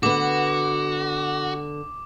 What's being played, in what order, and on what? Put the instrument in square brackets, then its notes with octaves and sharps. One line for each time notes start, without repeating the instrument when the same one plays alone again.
[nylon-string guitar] D3 B3 [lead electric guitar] F#4 [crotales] D6